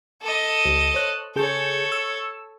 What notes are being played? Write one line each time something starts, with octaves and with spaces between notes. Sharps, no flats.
A4 D#5
C#2
C5 C#5 F#6
C#3 G#4 A4 C#5 G6
E6